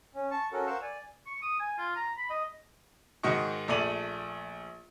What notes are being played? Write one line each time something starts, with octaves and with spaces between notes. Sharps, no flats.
C#4
A5 C#6
C#4 F#4 A4 A#4
A#4 C5 F5 F#5 C#6 E6
D5 G#5
C#6
D#6
G#5
F4
A#5
B5
D#5
G#2 D#3 F#4 D#5 C#6
A#1 A3 D5 D#7 F#7